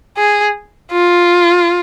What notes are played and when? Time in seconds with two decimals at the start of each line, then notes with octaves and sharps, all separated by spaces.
0.17 G#4
0.92 F4